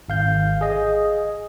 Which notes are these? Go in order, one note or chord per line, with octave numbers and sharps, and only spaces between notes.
G#1 F5 G6
G#4 D#5